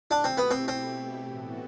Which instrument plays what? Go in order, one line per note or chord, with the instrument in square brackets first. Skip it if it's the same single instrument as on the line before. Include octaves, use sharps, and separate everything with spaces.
[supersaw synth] B2 A3 E4 G4 [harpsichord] D4
[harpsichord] C4
B3
C4
C4
[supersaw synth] A2 E3 B3 F#4 A4